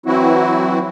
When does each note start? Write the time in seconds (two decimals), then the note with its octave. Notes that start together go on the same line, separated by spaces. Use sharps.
0.06 E3 F#3 C4 E4 F#4